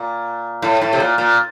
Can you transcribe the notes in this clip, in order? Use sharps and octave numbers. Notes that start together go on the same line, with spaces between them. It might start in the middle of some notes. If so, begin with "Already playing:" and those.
Already playing: A#2
A2
A2
C3
A#2
A#2